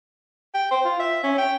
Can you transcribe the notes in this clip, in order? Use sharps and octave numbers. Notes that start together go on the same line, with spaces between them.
G5
C5
F4
E5
C#4
G5